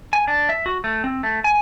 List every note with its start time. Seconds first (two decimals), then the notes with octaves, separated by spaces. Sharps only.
0.13 G#5
0.28 D4
0.49 E5
0.66 F#4
0.84 A3
1.04 C4
1.23 A3
1.44 G#5